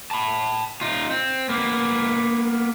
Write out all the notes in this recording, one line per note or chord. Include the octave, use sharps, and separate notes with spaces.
A5 B5
D#4 F4
C4
A#3 B3